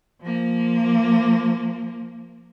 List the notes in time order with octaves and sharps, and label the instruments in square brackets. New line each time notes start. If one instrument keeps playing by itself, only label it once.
[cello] F3 A#3